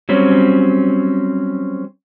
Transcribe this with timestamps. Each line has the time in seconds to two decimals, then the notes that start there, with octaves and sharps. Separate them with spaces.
0.09 F#3 G3 C4 C#4